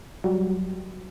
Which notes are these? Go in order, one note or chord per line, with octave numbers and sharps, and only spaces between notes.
F#3 G3